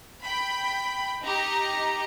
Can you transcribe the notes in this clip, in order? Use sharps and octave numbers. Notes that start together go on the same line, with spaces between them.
G5 B5
D#4 G4 A#5